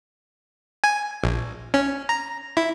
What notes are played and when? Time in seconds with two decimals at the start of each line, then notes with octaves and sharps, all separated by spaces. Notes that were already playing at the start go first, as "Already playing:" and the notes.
0.84 G#5
1.24 A#1
1.74 C#4
2.09 A#5
2.57 E4